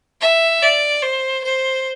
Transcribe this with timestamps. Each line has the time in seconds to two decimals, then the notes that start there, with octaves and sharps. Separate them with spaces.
0.21 E5
0.62 D5
1.03 C5
1.44 C5